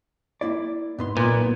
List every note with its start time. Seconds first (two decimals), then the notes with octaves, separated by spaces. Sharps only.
0.41 A#3 E4 D5
0.98 G#2 B3 C6
1.17 B1 A#2 B3 B4